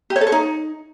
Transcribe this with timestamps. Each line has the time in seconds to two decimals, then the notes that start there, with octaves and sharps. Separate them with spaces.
0.10 G4
0.16 C#5
0.21 A4
0.27 C#5
0.32 D#4